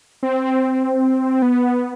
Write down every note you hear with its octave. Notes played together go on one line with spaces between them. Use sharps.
C4
B3